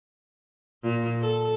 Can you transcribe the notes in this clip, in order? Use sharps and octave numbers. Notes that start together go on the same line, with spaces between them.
A#2
A4